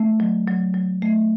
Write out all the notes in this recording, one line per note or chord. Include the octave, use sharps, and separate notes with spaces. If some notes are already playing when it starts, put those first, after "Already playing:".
Already playing: A3
F#3
F#3
F#3
A3